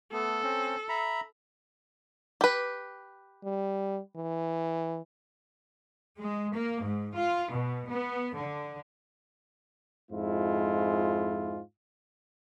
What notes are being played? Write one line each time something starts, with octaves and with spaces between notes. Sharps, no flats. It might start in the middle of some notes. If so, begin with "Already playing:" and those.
A3 B3 A4
C4 C#4
E5 A#5 B5
G4 B4
G3
E3
G#3
A#3
G#2
F4
B2
B3
D3
F2 G#2 G#3 E4 F4